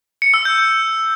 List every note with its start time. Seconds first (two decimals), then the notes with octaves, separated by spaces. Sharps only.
0.22 C#7
0.34 E6
0.45 G6